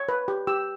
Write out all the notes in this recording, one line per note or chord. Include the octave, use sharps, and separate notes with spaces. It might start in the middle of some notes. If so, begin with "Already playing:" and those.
Already playing: C#5
B4
G4
G4 E6